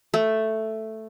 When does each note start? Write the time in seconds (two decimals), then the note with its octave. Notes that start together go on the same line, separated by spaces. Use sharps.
0.14 A3